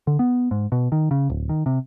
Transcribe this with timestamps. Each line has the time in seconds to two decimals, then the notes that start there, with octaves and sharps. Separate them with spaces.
0.07 D3
0.19 B3
0.51 G#2
0.72 B2
0.92 D#3
1.11 C#3
1.30 D1
1.49 D#3
1.66 C3